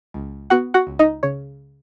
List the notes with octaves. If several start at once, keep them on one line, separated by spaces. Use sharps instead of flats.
C#2
B3 F#4 F#5
F#4 F#5
C#2
D#4 D#5
C#3 C#5